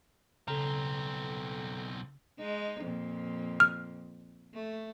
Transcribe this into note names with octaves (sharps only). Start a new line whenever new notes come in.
B1 C#3 C4 A4 A#5
G#3 D#4
F2 A#2
F6
A3